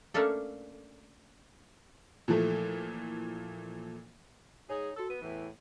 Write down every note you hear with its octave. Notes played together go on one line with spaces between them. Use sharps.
A3 A#3 C#4 D4 A4
A#2 E3 F3 A3
G#2 D#4 G#4 C#5
F#4 A4 E6
B3 D#7
E2 A2 E3